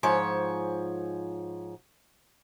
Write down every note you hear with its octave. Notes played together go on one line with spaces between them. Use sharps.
G#2 F3 C#5